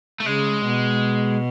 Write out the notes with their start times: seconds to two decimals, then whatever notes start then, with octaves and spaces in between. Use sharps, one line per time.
0.20 A3
0.26 C#3 G#3
0.65 B2